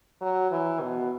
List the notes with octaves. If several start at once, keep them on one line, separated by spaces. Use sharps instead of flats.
F#3
E3
B2